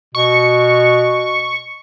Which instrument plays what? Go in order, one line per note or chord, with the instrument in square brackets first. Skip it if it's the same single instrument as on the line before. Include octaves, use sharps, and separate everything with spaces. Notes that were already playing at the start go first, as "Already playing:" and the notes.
[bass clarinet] B2 [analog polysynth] C#6